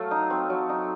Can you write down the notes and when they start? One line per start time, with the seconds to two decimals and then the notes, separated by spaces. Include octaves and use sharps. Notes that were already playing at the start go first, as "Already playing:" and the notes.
Already playing: F#3 A3 F5
0.11 D#4
0.30 C4
0.50 F#3
0.69 D#4